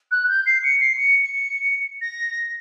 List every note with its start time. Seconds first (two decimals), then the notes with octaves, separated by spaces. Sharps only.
0.11 F#6
0.28 G6
0.46 C7
0.64 C#7
0.80 C7
0.97 C#7
1.23 C#7
2.01 A#6